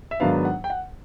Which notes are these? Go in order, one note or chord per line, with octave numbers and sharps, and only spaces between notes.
E5
G#2 D#3 F#3 B3 D4 F5
F#5
G5
F#5